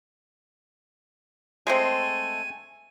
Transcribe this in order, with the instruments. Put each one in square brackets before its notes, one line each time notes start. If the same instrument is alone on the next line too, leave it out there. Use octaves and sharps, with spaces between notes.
[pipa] G#3 A3 C4 [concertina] G#5